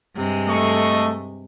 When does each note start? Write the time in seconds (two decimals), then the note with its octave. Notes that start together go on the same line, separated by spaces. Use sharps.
0.14 G2 C3 G#3
0.48 A3 A4 D#5 C#6